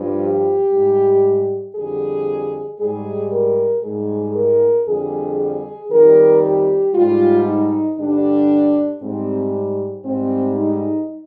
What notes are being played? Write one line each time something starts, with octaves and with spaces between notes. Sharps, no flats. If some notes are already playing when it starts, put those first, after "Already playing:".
Already playing: G2 F3
G4
G#2 G3
F2 D3 G3 G#4
G#2 G3 G#4
A#4
G#2 G3 G#4
A#4
F2 D3 G3 G#4
G#4
F2 D#3 G3 A#4
G4
G#2 G3 F4
D#4
G2 D3 G3 D4
G#2 G3 C4
G#2 G3 C4
D#4